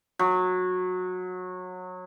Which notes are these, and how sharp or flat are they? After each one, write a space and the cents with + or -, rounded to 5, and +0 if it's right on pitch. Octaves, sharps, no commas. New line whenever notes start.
F#3 -20